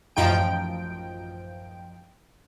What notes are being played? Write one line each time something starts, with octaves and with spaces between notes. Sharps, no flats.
A1 F#2 F3 D#4 G5 D7